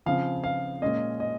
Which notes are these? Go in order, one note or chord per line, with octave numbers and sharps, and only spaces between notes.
C#3 F3 C4 F5
F5
A#2 G#3 C#4 D#5
D#5